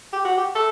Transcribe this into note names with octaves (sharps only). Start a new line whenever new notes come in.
G4
F#4
G4
A4